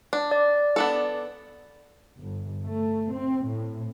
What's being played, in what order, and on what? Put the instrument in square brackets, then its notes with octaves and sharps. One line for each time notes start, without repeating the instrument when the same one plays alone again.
[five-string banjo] D4
[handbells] D5
[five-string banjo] B3 D4 A4
[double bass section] G1
A3
C4
A2